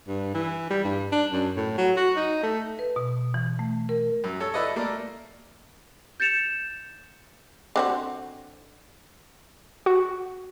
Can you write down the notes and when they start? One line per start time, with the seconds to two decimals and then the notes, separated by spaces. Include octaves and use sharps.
0.08 G2
0.34 E3
0.70 G3
0.84 G2
1.12 D4
1.32 F#2
1.56 A2
1.78 F#3
1.97 F#4
2.16 D#4
2.43 A3
2.79 B4
2.96 B2
3.34 E3
3.59 A3
3.89 A#4
4.24 F#2
4.40 A4 C#5
4.54 E4 A4 B4 D5 D#5
4.76 A3 A#3 D5
6.20 G6 A6 C#7 E7 F7
7.76 D3 C4 F#4
9.86 F#4